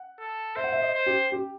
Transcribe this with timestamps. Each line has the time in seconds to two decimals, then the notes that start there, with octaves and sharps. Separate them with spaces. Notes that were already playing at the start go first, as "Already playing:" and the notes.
Already playing: F#5
0.19 A4
0.56 C5 E5
0.64 F#5
0.72 E5
0.82 D#5
0.95 C5
1.06 G4
1.32 G4